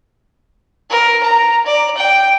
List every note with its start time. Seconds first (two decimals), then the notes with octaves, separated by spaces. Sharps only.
0.90 A#4
1.23 A#5
1.66 D5
1.97 G5